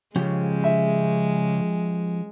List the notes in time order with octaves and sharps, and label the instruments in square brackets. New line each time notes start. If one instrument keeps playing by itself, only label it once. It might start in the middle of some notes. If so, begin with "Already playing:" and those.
[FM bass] C#3 [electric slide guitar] F3 C#4 G4 [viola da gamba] G#3
[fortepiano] E5